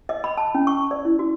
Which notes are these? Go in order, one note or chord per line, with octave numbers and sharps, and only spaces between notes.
D#5
B5
A5
C#4
C#6
D5
E4
F#4